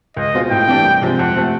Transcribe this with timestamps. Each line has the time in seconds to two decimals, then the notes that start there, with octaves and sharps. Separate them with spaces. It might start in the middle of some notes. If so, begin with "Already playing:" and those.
0.17 C#2 D#5
0.34 B2 G#3 C4 F4
0.51 A2 G5
0.68 E3 A3 D4 G4
0.85 C2
1.02 C3 F3 G#3 C4
1.18 F2 F#5
1.36 C3 F3 A3